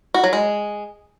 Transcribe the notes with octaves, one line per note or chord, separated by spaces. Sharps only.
F#4
F#3
G#3